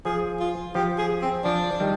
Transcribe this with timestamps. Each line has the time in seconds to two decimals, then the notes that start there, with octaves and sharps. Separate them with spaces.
0.05 F3 G#4
0.40 F4
0.75 F3 G4
0.98 G#4
1.22 C4
1.45 F3 D4
1.80 D#3 G3